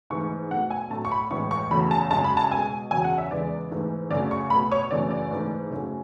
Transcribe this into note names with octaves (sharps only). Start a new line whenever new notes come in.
G#2 E3 A3 C#6
B2 F#3 A3 F#5
G#5
A2 F#3 A3 A5
C#6
B5
A2 E3 G#3 C#6
C#6
E2 C#3 F#3 A3 B5
A5
F#2 C#3 G#3 A5
B5
A5
B2 G#3 G#5
E2 C#3 F#3 G#5
F#5
E5
E2 C#3 E3 G#3 D5
G#2 E3 A3
F#2 C#3 F#3 A3 D5
C#6
B2 F#3 A3 B5
C#5
F#2 C#3 E3 A3 D5
D5
G#2 E3 A3
F#2 C#3 F#3 A3